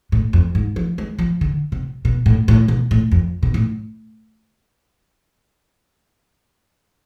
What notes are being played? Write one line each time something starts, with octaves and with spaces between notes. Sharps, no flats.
A2
F2
G#2
F3
G#3
F3
D3
C3
B2
A2
A2
B2
A2
F2
B2
A2